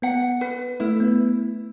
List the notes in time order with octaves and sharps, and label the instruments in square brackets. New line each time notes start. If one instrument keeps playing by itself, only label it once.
[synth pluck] B3 [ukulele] F#5
[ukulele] B4
[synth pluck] A3 [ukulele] E4
[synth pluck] B3